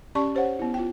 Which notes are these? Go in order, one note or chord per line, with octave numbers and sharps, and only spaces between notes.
C#4 G4 D5 A5 C#6
G4 C5 C#5 F#5
B3 E4
F4 G5